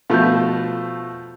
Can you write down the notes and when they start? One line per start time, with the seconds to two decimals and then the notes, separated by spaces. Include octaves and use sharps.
0.10 B2 F3 A3 F5 G6